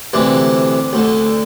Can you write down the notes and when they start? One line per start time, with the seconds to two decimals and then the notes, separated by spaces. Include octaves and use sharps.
0.13 D2 C3 E3 D4
0.93 D2 D3